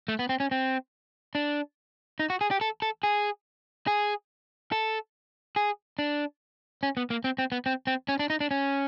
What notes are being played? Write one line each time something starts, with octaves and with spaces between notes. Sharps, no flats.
A3
B3
C4
C#4
C4
D4
D#4
F#4
G#4
G4
A4
A4
G#4
G#4
A4
G#4
D4
C#4
B3
A#3
C4
C4
B3
C4
C4
C#4
D4
D#4
D4
C#4